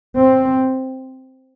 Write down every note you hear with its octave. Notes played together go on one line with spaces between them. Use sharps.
C4